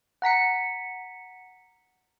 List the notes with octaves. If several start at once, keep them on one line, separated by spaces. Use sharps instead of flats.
F#5 A#5 B6 C#7